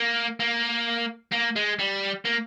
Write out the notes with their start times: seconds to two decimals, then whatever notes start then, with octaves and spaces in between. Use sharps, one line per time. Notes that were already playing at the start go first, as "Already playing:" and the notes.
Already playing: A#3
0.40 A#3
1.32 A#3
1.56 G#3
1.79 G3
2.25 A#3